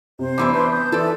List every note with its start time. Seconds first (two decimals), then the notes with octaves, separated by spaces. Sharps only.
0.19 C3 C5
0.38 F#2 E3 B3 D4 D6
0.53 B4 C6 G6
0.70 D#6 G6
0.92 E3 A4 B4 D5 E5